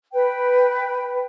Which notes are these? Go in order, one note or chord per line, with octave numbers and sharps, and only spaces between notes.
B4 G5